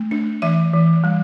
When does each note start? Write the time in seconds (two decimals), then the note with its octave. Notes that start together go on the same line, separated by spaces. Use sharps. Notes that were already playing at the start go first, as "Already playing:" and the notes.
Already playing: A3
0.11 D4
0.42 E3 E5
0.74 E3
1.04 G3